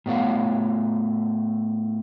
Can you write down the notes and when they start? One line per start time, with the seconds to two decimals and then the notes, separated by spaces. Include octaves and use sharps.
0.06 A2 B3 C#5 F5